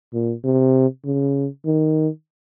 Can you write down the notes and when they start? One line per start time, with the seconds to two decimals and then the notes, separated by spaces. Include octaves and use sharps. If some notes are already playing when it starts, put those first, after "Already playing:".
0.13 A#2
0.44 C3
1.05 C#3
1.66 D#3